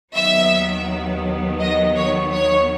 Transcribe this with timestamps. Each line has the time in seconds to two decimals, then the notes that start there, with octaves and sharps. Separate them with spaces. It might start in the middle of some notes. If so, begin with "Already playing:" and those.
0.14 D#2 D#3 F#3 B3 E5
1.60 D#5
1.96 C#5
2.33 C#5